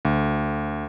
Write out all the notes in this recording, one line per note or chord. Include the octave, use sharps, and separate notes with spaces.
D2